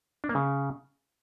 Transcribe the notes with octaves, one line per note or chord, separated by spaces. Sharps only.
D4
A#3
C#3